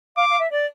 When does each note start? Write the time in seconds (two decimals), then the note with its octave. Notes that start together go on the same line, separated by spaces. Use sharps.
0.17 F5 D6
0.29 F5
0.39 E5
0.51 D5